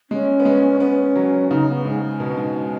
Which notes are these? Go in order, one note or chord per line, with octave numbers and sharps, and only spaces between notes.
G#3 C#4
B3
G#3
B3 C#4
F#3
C#3 D#4
B3
G#2 G#3
G#3
B2
G#2